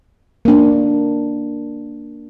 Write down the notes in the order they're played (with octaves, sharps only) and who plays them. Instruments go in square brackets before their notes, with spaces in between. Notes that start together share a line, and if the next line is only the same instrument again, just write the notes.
[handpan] A#3 D4